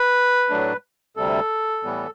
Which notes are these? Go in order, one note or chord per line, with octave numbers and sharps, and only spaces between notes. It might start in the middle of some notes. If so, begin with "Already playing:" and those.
Already playing: B4
A2 F#3 A3 D4
D2 C3 G3 A4
A2 E3 G3 B3